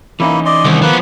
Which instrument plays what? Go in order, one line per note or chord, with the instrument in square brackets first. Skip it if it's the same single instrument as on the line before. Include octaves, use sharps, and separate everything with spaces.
[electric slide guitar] E3 C#4 D#4 [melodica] A#3 E4
[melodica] D5 D#5 C6
[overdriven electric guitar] C2 [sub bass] D#3
[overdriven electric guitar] F3 B3 [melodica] A#3 B4